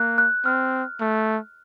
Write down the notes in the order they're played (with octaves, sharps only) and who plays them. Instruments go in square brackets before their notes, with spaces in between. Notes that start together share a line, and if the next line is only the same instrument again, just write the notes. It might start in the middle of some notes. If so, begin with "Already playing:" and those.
Already playing: [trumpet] A#3 [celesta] F#6
[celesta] F#6
[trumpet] C4 [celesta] F6
[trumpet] A3